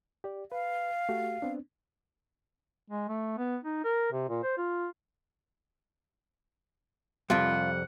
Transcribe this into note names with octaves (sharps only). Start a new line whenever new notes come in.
G4 D5
B4 F5
A3 F#4 G4
B3 C4 D4
G#3
A3
B3
D#4
A#4
C3
A#2
C5
F4
C2 F2 G3 F4 F#5